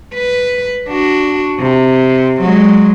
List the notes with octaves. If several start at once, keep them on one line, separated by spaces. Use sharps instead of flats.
B4
D4 F#4
C3
F#3 G#3